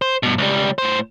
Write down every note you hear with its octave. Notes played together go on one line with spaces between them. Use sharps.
C5
G2 B2
C#2 G3
A2 C5